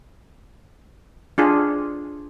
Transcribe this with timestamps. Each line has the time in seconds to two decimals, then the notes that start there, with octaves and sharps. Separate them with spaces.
1.38 D4 F4 G#4